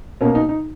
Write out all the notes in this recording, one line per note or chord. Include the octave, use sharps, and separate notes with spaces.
B2 A#3 C#4
D#4
D#4